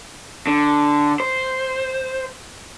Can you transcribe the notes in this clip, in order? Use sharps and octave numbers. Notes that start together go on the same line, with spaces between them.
D3
C5